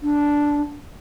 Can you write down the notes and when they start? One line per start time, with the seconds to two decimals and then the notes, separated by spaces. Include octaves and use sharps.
0.03 D4